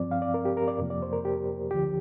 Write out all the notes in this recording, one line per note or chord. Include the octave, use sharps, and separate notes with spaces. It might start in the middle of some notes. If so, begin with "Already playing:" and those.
Already playing: G2 F3 C4 D5
F5
D5
A#4
G4
A#4
D5
F2 C3 F3 A#3
D5
C5
A#4
G4
D2 D3 F3 G4